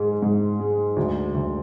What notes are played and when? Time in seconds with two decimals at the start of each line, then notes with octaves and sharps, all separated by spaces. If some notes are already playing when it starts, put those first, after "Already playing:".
Already playing: G#2 G#3
0.22 G#2
0.60 G#3
0.96 D2
1.34 D2